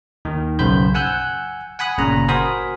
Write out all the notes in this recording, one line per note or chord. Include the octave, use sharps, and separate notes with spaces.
D#2 D#3
B1 F#2 C#3 C5 B5 G6
F#5 G#5 E6 F#6 G6
F#5 G#5 B5 D#6 F#6
G1 A#2 C#3 A#5
F#4 A#4 C5 G#5 B5 D#6